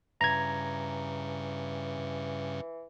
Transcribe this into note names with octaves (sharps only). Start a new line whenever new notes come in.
G2 C#3 E3 A#5 G#6